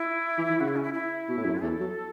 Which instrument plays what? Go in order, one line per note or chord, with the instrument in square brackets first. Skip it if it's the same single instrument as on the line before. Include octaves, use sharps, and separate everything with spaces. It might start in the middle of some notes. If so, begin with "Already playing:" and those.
Already playing: [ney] E4
[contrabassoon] E3
E3
[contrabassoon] C#3 [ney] F#4
[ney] E4
C#4
E4
E4
[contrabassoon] B2
A2
F#2
[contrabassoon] E2 [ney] A4
[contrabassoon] F#3